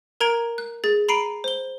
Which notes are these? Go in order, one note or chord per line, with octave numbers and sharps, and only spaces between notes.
A#4 A#5 G#6 D7
F#6
G#4 A6
A#5 B5 C7 D7 D#7
C5 G7